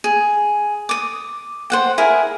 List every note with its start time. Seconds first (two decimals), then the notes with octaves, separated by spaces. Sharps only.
0.04 G#4
0.89 D6 D#6
1.70 C5 F#5 G5
1.98 E4 G#4 A#4 G#5